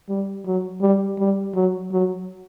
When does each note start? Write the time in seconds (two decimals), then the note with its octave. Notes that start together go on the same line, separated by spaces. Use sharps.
0.09 G3
0.46 F#3
0.82 G3
1.19 G3
1.55 F#3
1.92 F#3